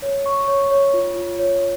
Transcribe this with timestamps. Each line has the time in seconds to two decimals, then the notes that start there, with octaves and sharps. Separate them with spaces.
0.02 C#5
0.26 C#6
0.48 C#5
0.71 C#5
0.94 F4
1.16 F4
1.39 C#5